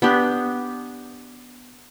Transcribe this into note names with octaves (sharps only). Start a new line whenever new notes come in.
B3 D4 G4